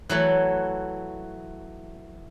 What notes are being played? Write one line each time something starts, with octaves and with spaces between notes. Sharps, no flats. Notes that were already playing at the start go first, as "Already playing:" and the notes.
E3 F#3 A3